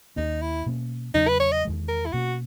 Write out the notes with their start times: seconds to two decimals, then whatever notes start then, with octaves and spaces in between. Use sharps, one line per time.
0.16 D#2 D#3 A#3 C#4 D#4
0.42 E4
0.66 B2 A#3 C#4
1.14 E2 C#3 F#3 C#4 D#4
1.28 B4
1.40 C#5
1.52 D#5
1.65 E2 D#3 G#3
1.89 A#4
2.06 E4
2.13 B2 A#3 C#4 F#4